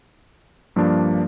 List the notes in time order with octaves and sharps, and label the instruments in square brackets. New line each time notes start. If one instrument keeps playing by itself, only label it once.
[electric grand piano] G2 F3 A#3 D4